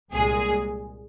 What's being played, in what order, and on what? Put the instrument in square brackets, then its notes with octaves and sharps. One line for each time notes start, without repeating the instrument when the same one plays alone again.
[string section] C2 A#2 G#3 G#4